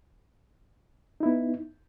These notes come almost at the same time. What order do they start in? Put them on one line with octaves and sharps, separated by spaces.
D#4 E4 B3